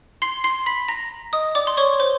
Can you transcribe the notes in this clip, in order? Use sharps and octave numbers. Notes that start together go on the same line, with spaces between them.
C6 C7
C6 C7
B5 B6
A#5 A#6
D#5 D#6
D5 D6
C6
C#5 C#6
C5 C6